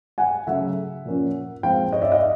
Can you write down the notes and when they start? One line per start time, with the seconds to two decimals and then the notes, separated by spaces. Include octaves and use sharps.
0.18 F#5 G#5
0.47 C#3 F#3 A3 E5 F#5
1.05 A#2 F3 A#3 C#4
1.63 A#2 F3 G#3 C4 F5 G5
1.93 C#5 D#5
2.02 D5 E5
2.12 D#5 F5